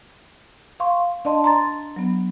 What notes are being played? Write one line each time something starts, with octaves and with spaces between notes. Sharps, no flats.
F5 C6 C#6
D4 D5 D#5 A5 C6
A#5 C6 A6
F#3 B3